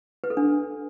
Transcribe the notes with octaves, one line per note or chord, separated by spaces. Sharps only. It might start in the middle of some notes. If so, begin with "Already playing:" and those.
B4
A4
D4